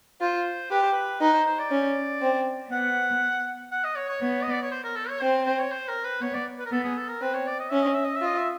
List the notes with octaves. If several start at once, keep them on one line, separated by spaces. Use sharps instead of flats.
F4 C5
G4 B4
C5
B4
D#4 B4
C5
C5
D5
C#4
C4
B3 F#5
F#5
D#5
C#5
C#5
B3 C#5
D#5
D5
C#5
C5
A#4
A4
C#5
C4 C5
C5
C#5
C5
A#4
B4
B3 C#5
D5
B4
A#4
B3 A4
G#4
A4
A#4
C4 B4
C#5
D5
D#5
C#4 E5
D#5
E5
D#5
E5
F4 D#5
E5